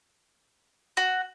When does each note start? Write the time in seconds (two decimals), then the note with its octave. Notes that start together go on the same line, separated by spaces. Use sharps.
0.97 F#4